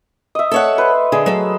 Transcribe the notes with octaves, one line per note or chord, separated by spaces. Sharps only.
D#5 E5
A4 C#5 F#5
B4 C5
D3 G#4
F#3 A4